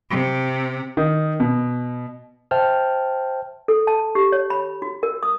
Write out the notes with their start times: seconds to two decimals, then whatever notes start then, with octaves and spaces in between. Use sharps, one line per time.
0.10 C3
0.97 D#3
1.40 B2
2.51 C5 E5 G5 A5 F6
3.68 A4
3.87 A5
4.15 G4
4.32 C#5
4.50 B5
4.82 F#4
5.03 A#4
5.23 D#6